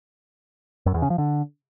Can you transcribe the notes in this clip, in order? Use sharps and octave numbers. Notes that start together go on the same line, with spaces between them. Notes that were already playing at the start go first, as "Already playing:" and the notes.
F#2
E2
C#3
F3
D3